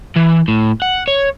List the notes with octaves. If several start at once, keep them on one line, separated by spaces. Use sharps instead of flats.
E3
A2
F#5
C#5